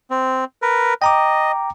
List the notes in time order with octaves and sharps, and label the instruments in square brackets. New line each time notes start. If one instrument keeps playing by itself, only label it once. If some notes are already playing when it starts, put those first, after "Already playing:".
[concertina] C4
A#4 B4
[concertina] D#5 [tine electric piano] G5 A#5 D6